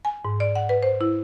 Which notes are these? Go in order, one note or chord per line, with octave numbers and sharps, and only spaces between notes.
G#5
G#2
D5
F#5
B4
C5
E4